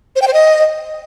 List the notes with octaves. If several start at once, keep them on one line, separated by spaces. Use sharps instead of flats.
C5
G5
C5
D#5